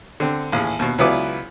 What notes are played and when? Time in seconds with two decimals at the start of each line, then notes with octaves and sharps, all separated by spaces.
0.20 D3 C4
0.52 A1 D#2 G#4
0.79 D#2 B2
0.98 C#2 F#3 B3 E4 B4 D5